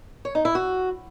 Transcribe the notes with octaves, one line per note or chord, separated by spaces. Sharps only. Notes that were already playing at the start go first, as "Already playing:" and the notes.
C#5
D#4
E4
F#4